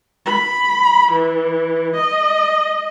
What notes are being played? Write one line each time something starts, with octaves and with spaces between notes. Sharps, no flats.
B5
E3
D#5